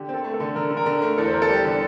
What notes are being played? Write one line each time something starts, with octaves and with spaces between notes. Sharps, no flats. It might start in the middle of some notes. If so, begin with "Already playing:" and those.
Already playing: D3 G4
C4
A4
A3
A4
D3
D3 A#4
D3
A#4
D3
A3 A#4
E2 A4
C5
E2 A#4
A4
G3 G4
D3